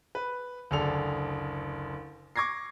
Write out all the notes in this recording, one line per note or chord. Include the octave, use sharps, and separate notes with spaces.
B4
F#1 D2 G#4 A4 D5 F7
C#6 D6 G#6 A#6 C7